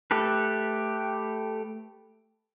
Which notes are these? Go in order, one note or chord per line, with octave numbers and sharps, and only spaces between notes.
A3 G4 A4 B4